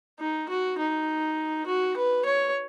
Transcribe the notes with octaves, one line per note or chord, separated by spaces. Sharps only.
D#4
F#4
D#4
F#4
B4
C#5